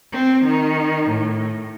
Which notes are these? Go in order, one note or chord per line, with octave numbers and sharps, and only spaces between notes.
C4
D#3
A2